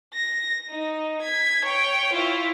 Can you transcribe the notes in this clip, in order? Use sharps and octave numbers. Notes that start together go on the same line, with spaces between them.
A#6
D#4
G#6 B6
C#5 G5
E4 F4